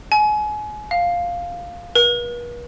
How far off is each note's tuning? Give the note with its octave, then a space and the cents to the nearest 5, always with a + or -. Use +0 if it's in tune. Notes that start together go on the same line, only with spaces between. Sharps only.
G#5 +30
F5 +5
B4 -45